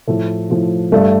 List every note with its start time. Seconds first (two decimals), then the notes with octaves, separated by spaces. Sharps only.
0.07 A2 F3 A3
0.50 A2 F3
0.92 G2 G3 A3